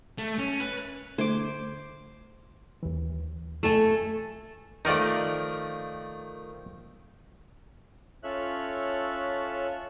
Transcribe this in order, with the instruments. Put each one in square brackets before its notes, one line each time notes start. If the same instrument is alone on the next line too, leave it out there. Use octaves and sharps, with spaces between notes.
[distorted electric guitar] A3
C#4
B4
[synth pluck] D3 A3 G#6 [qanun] C5 D6
[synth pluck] D#2 E3
[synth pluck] F#2 C3 [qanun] A3 A4 G#5
[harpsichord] D#3 F3 A3 [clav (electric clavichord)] D#4 A#4 D5
[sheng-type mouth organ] C#4 F4 A4 C#5 E5 F#6